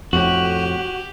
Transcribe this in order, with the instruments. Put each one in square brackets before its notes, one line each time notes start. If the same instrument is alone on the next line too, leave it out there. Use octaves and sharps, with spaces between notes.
[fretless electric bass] F2 A2 [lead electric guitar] F#4 [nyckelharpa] G4